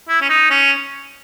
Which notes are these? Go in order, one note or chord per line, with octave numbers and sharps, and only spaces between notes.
E4
C#4
D#4
C#4